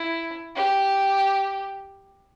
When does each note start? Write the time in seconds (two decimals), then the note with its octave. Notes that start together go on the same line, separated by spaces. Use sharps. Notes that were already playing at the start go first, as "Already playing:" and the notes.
Already playing: E4
0.55 G4